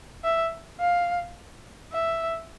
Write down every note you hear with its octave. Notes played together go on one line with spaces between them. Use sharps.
E5
F5
E5